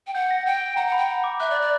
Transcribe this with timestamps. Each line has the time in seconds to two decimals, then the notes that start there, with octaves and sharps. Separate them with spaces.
0.07 G5
0.15 F#5 G6
0.31 A#6
0.46 G5 G6
0.77 F#5 A#5
0.87 F#5
0.92 B5
0.98 G5
1.09 F#5
1.24 D6
1.40 E5 F#6
1.50 D5
1.62 D5